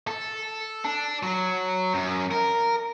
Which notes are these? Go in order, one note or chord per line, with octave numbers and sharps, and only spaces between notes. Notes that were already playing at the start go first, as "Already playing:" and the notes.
A4
D4
F#3
F#2
A#4